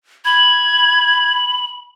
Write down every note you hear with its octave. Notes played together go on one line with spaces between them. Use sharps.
B5 G#6